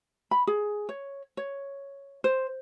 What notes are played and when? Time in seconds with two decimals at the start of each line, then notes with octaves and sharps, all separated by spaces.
0.31 B5
0.47 G#4
0.89 C#5
1.37 C#5
2.24 C5